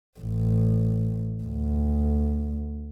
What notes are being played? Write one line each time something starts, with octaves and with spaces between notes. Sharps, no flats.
A1
D2